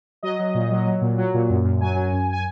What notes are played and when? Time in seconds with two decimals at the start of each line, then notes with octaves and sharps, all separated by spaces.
0.23 F#3 D#5
0.39 F#3
0.54 A#2
0.71 F#3
0.87 F#3
1.01 A#2
1.18 F#3
1.34 A#2
1.50 F#2
1.64 F#2
1.81 F#3 G#5
1.96 F#3
2.12 F#2
2.33 G#5